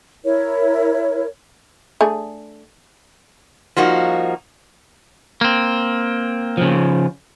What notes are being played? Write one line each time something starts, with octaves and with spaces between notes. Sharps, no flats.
E4 A#4 C#5
A3 D4 G#4
F3 G3 A#3 D#4 F#4
A#3 C4
C#3 F3